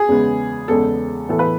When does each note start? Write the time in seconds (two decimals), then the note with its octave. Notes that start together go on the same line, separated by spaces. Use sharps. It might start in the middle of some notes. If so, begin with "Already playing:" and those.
Already playing: G#4
0.08 E2 C#3 G#3 B3
0.68 E2 C#3 G#3 B3 A4
1.29 A2 E3 B3 A4
1.39 B4